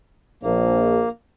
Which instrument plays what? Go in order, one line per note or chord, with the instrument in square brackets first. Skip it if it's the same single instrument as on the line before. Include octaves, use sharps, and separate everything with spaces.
[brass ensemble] A#1 [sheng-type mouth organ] A#3